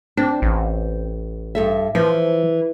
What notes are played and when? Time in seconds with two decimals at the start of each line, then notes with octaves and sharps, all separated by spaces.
0.17 C4 D4
0.42 A1
1.55 G2 A4 E5
1.95 E3 F3